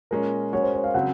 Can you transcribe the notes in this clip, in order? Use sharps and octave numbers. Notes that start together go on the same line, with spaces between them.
A#2 G#3 C#4 A#4
G#3 C#4 F#4 C#5
C5
C#5
F5
C#3 F#3 C4 F#5